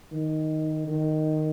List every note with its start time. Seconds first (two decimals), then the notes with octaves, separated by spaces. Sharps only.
0.12 D#3
0.87 D#3